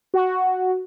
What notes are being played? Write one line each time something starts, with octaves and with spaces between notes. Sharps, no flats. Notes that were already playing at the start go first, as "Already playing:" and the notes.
F#4